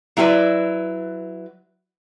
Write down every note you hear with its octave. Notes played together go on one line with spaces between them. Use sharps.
F#3 E4 G#4 A4 B4 D5